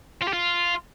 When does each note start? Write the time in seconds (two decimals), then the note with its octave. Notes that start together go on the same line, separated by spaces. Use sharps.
0.22 F4
0.28 G4
0.33 F4